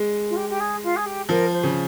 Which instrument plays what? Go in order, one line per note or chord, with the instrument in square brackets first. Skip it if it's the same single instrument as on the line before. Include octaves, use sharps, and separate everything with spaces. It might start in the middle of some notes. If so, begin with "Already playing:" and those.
Already playing: [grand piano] G#3
[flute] F4
G4
G4
G#4
F4
G#4
G4
[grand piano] F3 [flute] A#4
[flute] C5
[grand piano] C#3